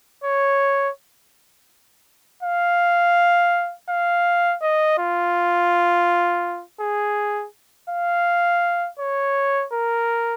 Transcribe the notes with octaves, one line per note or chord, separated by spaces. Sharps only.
C#5
F5
F5
D#5
F4
G#4
F5
C#5
A#4